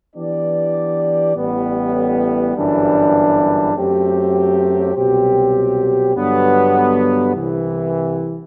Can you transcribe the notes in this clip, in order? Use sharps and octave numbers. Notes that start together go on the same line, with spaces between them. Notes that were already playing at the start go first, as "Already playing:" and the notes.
E3 B3 D4 G4 D5
A1 A2 G3 B3
G1 F#2 E3 G3 D4
F#2 F#3 A3 C4 G4
C2 B2 F#3 C4 G4
G2 D3 F#3 B3
C2 C3 E3